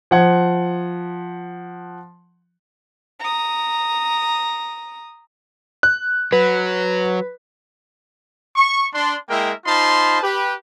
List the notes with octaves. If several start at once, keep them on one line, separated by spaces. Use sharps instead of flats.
F3 F#5 G#6
A#5 D#6
F#6
F#3 B4
C#6
D4 C6
G#3 A#3 E4 A#4 E5 G5
D#4 F4 C5 A5 B5 C6
G4 B4